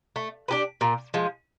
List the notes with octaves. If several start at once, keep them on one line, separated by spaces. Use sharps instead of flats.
A3
D4 G4 B4
A#2
F3 G#3